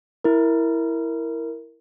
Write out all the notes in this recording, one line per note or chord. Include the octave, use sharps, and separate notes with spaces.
E4 A#4